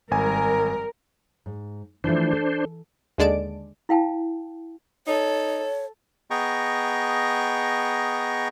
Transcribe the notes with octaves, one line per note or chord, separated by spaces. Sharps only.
G#1 G3 A#4 G#5
G#2
E3 F3 A3 D4 C5
A4
D#2 D3 G#3 D5 A5 D7
E4 F5 G5 A5
D#4 A4 C#5
B3 G#4 D#5 G5 A#5 C#6